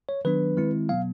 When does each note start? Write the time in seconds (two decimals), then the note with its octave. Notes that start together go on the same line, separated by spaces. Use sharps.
0.09 C#5
0.25 D#3 F#3 B3 D4 B4
0.57 D#3 G#3 C4 E4
0.89 B2 F#3 B3 F5